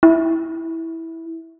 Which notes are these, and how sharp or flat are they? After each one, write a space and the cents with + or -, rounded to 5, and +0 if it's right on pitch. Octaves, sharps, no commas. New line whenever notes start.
E4 -10